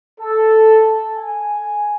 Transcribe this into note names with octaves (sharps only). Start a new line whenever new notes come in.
A4
G#5